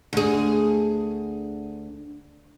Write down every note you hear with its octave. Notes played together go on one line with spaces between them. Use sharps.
D2 G#4